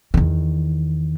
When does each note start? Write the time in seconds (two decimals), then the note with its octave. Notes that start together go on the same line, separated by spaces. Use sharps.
0.14 E2 D#3